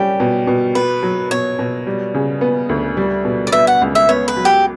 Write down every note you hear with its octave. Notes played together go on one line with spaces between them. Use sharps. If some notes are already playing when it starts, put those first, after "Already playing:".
Already playing: G3 C#4 G4
B2
B2
B3 B4
F#3
B2 C#5
B2
G3
C#3
B3
D2
G3
B2
D5
B3 E5
F#5
C#2
E5
B3 C#5
B4
F#3
G4